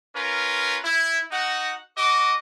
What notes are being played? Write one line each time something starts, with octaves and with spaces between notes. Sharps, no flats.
C#4 F4 A#4 B4
E4
D#4 F#4 F#5
F#4 D#5 D6